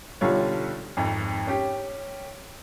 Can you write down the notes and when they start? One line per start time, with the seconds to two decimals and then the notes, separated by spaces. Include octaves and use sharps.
0.21 B1 D3 G3 F4 C#5
0.97 G#1 F2
1.47 C#4 G4